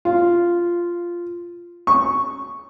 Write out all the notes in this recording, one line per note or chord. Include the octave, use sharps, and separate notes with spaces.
F4
C#6